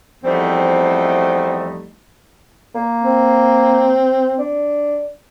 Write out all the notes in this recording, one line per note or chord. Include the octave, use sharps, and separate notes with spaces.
E2 F3 G3 A3 C4 D#4
A#3
C4
D4